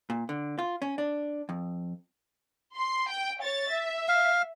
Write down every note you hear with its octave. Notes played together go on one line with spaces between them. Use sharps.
A#2
D3
F4
C#4
D4
F2
C6
G5
C#5 A6
E5
F5